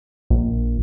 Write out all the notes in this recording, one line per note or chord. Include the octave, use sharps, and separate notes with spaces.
A#1